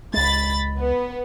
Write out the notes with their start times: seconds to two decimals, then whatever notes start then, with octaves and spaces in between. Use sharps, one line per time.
0.13 C#2 G#3 B5 A6
0.78 B3